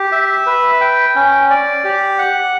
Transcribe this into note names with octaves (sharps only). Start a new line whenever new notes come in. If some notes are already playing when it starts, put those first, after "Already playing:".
Already playing: G4
E5
B4
G5
C#4
D5
G4
F#5